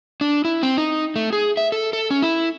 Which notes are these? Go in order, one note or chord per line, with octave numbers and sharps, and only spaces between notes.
D4
E4
C4
D#4
A3
G#4
E5
A4
A4
C#4
E4